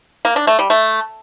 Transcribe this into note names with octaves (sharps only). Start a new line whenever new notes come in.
A#3
D4
A3
G3
A3